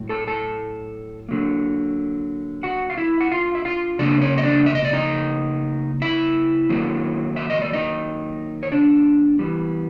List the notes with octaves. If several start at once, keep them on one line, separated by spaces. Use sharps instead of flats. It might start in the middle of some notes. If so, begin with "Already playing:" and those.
Already playing: A2 F#3
A4 A5
A4 A5
D3 F#3 A#3
F#4 F#5
F5
E4 E5
F#5
F4 F5
E5
F4 F5
C#3 F#3 A#3 D4 D5
C#4 C#5
D#5
D4 D5
E5
D#5
D5
D#4 D#5
E4 E5
D#3 F#3 A#3
E5
D#5
D5
D#4 D#5
C#5
D4 D5
E3 G3 B3